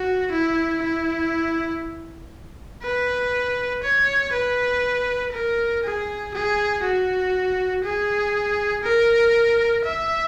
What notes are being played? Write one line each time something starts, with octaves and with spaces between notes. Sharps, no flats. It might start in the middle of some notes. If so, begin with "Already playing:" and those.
Already playing: F#4
E4
E4
B4
C#5
B4
A#4
G#4
G#4
F#4
G#4
A#4
E5